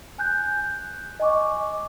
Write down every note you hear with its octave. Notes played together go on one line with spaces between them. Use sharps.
G#5 F#6 G6
D#5 G#5 C#6 D6